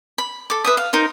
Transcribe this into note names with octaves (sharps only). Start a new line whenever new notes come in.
B5
A4 D6
B4 E5 D#6
F5
D#4 A#4 C5